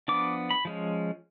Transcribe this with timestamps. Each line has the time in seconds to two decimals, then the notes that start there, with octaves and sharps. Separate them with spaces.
0.08 F3 B3 D4 D6
0.51 B5
0.65 F3 G#3 C#4